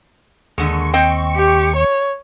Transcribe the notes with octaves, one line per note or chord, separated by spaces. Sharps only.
D#2 A#2 D3 G#3 C#6
C4 D#5 G5
G4
C#5